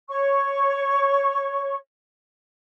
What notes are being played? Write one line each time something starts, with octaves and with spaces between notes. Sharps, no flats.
C#5 C#6